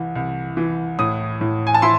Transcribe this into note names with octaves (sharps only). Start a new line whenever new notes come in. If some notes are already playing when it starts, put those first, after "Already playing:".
Already playing: C2 E3
C2
E3
A2 D#6
A2
G#5
A5
E4 C6